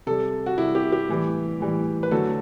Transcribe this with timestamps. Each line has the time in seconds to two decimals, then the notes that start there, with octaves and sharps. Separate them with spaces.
0.07 C3 G3 A4
0.46 F#4
0.58 C3 G3 E4
0.75 G4
0.92 G4
1.09 A2 E3 G3
1.60 A2 E3 G3
2.03 B4
2.11 D3 F#3 A3 A4